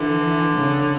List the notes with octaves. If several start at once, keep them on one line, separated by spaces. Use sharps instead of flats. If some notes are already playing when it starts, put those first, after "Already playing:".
Already playing: D3 E3
C#3